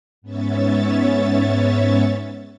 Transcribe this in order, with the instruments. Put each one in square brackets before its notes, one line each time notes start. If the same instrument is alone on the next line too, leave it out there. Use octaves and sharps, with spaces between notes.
[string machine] G#2 B3 C#4 C#5 E5 A6